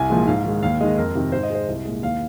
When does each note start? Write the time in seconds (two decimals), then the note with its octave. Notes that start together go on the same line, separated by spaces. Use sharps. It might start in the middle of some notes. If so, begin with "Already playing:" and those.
Already playing: C2 G#5
0.10 A#2 F3 G#3
0.27 G#2 F5
0.45 D#3 G#3
0.63 D#2 F5
0.81 D#3 G#3 D#5
0.98 F2 A#4
1.15 C3 D#3
1.32 G#2 C5
1.43 D#5
1.50 G#3 C5
1.68 C2
1.85 A#2 G#3
2.03 D#2 F5